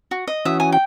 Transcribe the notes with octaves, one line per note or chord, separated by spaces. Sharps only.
F#4
D#5
E3 C#4 F#4 E5 D#6
G#5 D#6
G5